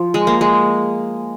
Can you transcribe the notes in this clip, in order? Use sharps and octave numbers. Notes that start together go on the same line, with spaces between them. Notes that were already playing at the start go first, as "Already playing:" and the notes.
Already playing: F3
G#3
A#3
G#3